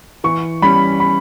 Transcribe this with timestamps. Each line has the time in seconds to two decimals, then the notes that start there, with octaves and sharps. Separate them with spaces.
0.24 E3 C#6
0.62 G3 C#4 B5
1.00 B5